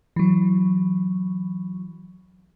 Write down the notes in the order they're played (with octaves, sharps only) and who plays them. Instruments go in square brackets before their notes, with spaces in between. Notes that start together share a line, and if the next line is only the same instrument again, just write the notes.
[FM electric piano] E3 F#3